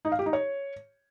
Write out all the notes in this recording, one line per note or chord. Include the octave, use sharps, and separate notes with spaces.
D#4
F5
G4
D#4
C#5